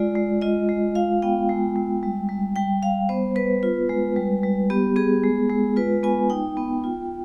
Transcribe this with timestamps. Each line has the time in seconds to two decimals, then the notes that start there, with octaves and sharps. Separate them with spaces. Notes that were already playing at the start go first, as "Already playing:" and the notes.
Already playing: G#3 F4 D5
0.15 G#3
0.41 F4 D#5
0.69 G#3
0.95 F4 F5
1.22 B3 G5
1.49 G#3
1.76 G#3
2.03 G3
2.29 G3
2.56 G3 G5
2.82 G3 F5
3.09 B3 C5
3.36 B3 B4
3.63 F4
3.89 G#3
4.16 G3
4.43 G3
4.70 B3 G4
4.96 B3 G#4
5.23 G#3
5.50 G#3
5.76 F4 B4
6.03 B3 G#5
6.30 D#4 G5
6.57 B3
6.84 F4